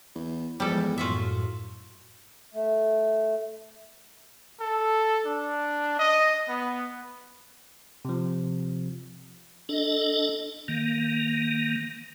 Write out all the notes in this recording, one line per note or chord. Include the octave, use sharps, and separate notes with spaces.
E2
E2 F3 G3 G#3 A4
F#2 A2 F4 F#4 E5
A3
A4
D4
D#5
B3
C3 F3
D4 A4 D#5
D#3 A#3